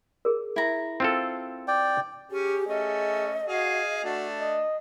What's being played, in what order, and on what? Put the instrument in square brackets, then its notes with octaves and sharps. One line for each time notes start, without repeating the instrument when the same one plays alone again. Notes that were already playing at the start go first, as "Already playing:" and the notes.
[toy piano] G#4 A#4
[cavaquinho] E4 A#5
[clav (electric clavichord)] C4 F4 A4
[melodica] D5 G5
[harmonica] C#4 [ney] G4 [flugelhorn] G#4
[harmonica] A3 C#4 [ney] D#5
[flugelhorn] F#4 [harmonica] G#4 F5
[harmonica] A3 D4 [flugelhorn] F#4
[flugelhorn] D#5